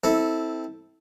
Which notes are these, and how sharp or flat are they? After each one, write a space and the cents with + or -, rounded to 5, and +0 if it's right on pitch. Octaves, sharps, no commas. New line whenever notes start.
C4 +0 E4 -25 A4 +0